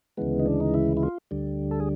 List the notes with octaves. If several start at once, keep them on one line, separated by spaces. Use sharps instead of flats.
D2 C#3 E3 G#3 B3
D#4
D4
D#4
E4
E4
F4
D2 D3 G3
A4
G#4